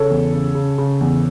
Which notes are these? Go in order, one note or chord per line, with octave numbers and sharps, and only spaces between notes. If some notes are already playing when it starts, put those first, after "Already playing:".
Already playing: C#3 A4 C#5
E2
C#3
C#3
C#3
E2